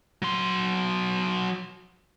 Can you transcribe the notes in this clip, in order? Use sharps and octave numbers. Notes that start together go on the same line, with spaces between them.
F#3 C6